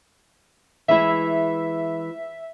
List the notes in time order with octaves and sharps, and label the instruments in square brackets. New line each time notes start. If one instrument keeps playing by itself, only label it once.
[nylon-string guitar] E3 G#3 E4 [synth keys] E5